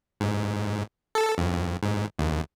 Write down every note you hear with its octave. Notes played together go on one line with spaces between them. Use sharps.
G#2
A4
F2
F2
G#2
D#2